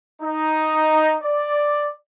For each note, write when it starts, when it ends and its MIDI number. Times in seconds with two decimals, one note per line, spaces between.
0.22 1.15 63
1.22 1.89 74